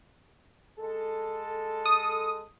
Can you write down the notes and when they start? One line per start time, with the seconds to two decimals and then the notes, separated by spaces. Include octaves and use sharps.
0.80 G#3 A4
1.86 D#6